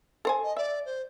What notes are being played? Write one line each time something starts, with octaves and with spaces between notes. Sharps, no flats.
A4 C5 G#5
D#5
D5 E5
C5